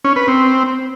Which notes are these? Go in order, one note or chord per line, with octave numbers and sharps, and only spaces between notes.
C#4
B4
C4